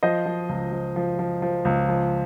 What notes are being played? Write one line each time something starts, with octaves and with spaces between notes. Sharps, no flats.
F3 C5 D#5
F3
C#2
F3
F3
F3
F3
C#2
F3